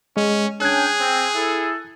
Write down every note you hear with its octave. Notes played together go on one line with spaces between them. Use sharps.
G#3 C#4
C#4 D4 G#4 G5 F#6 G#6
C4
E4 A4